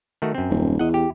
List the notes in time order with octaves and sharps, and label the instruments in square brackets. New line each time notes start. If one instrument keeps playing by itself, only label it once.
[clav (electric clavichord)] D#3 A3 F#4
F#2 C4
[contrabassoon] D#1
[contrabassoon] E2 [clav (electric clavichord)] D#5 F#5
[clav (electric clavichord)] G4